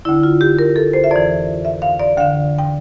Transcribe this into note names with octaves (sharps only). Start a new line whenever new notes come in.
D2 D3 E4
F4
G4
A#4
A4
C5
E5
F2 E3 D5
E5
F5
D5
D2 D3 F5
G5